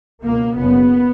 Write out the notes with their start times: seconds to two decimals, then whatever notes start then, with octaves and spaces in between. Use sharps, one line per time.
0.24 C#2 B2 A#3
0.58 F#1 F#2 C#3 B3